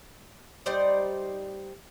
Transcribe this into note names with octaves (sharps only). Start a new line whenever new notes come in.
G3 D#4 C5 D5